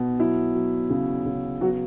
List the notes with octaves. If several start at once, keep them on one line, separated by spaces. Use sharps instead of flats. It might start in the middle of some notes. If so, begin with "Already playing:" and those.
Already playing: B2
F#3 E4
F#3
C#3
C#3
F#3 B3 F#4